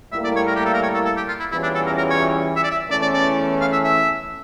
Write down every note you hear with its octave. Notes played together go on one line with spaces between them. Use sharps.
A2 G3 A#3 E4 E5
D5
C#5
A#4
G4
A4
A#4
C#5
A4
A4
G4
F4
E4
E2 E3 G3 C#4 E4 F4
D4
A4
A#4
A#4
C#5
E5
D5
E5
E2 E3 A3 C#4 D5
D5
D5
F5
E5
E5